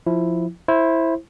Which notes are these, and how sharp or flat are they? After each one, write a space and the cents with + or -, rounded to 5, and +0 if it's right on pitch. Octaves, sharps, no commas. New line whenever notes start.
F3 +0 E4 +0
E4 +0 C5 +15